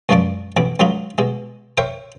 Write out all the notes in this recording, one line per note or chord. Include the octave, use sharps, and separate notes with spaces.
C#2 F#2 F3 D4 D5 D6
A1 B2 B5 D6
C#2 D3 F#3 D#4 F4 B5
B2 G#3
A#4 C5 C#5 E5 G5